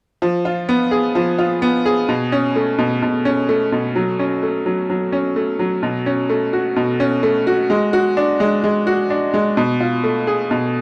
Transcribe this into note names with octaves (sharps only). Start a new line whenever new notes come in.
F3
F4
B3
G#4
F3
F4
B3
G#4
B2
C#4
A3
B2
B2
C#4
A3
B2
F#3
C#4
A3
F#3
F#3
C#4
A3
F#3
B2
C#4
A3
F#4
B2
C#4
A3
F#4
G#3
F#4
D4
G#3
G#3
F#4
D4
G#3
B2
F4
A3
G#4
B2